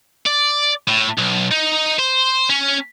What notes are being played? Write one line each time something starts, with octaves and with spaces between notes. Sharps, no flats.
D5
A2
B1
D#4
C5
C#4